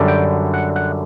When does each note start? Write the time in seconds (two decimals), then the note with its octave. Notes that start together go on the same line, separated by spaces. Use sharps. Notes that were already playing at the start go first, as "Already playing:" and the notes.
Already playing: F#2 D3 G3
0.08 G5
0.54 F#5
0.76 F#5